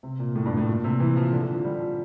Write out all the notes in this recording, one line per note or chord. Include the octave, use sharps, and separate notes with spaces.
C3
A#2
A2
G2
A2
A#2
C3
E3
F3
D3
D3
F3
G3
F3